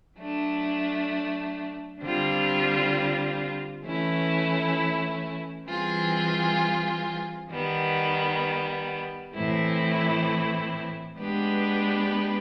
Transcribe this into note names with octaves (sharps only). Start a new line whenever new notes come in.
F#3 A3 D4
D3 G3 C4 F4
E3 A3 C#4 E4
E3 G3 C4 F4 G#4
D#3 G3 B3
A2 E3 A3 C4 E4
G#3 B3 D4 G4 B4